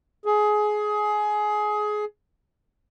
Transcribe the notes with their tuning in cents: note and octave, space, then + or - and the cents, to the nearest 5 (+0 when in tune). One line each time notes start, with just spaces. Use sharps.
G#4 +20